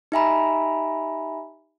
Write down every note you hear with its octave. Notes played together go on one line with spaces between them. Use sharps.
D#4 G4 E5 G#5 A#5 B5